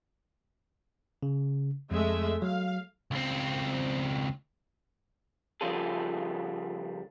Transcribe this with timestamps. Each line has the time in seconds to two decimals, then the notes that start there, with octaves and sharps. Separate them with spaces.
1.23 C#3
1.91 F2 G#3 A3 E5
2.42 F#3 F5
3.11 C#2 C4
5.61 C#3 F3 G3 F4 G#4 A4